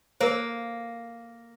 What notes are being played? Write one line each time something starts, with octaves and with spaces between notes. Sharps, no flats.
A#3 A#4 C5